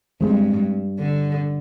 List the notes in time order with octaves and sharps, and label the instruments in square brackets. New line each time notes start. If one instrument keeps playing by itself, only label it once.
[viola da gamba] G2 [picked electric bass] F3 G#3 C4
[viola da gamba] D3